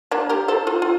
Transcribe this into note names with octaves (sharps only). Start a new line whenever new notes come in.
A#3 D4
G4 A#4
A4 C5
F4 A4
F4